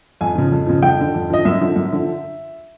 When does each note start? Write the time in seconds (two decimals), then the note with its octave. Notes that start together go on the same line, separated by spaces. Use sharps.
0.21 F2 G#5
0.35 C#3 F3
0.52 F2
0.67 C#3 F3
0.82 F2 G5
0.99 D3 F3
1.15 F2
1.30 D3 F3 D#5
1.45 F#2 E5
1.61 D3 F3
1.76 F#2
1.92 D3 F3